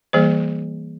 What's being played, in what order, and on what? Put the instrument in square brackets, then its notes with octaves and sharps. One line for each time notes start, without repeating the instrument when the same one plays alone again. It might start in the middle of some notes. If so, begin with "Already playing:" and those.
[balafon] E3 G3 A#3 G#4 C5